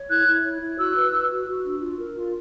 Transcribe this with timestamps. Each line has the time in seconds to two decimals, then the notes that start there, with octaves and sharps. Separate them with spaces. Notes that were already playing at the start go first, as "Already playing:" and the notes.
Already playing: C#5
0.10 E4 F#6 G#6
0.28 E4
0.44 C#5
0.61 E4
0.78 F#4 E6 F#6
0.95 B4
1.12 B4
1.30 F#4
1.47 F#4
1.65 D4
1.81 F4
1.99 A#4
2.15 F4